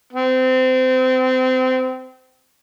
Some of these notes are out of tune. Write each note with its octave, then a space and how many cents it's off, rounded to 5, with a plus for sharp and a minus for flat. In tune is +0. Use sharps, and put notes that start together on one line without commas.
C4 -25